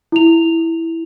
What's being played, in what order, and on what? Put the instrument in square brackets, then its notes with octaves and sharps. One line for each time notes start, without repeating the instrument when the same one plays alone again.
[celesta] E4 F7